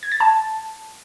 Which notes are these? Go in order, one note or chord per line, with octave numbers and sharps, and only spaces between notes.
G#6
A6
A5